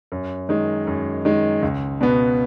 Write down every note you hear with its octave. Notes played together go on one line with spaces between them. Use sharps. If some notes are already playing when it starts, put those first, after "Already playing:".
F#2
D#3 G#3
F#2
D#3 G#3
C#2
B2 B3